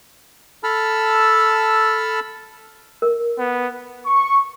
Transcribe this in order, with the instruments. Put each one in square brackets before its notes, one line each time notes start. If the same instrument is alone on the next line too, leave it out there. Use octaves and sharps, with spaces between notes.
[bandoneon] A4 A5 B5 E6 F6
[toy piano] A#4
[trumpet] B3
[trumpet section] C#6